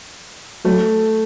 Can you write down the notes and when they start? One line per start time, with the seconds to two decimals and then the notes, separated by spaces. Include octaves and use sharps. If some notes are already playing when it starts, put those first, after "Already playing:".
0.65 F#3 A3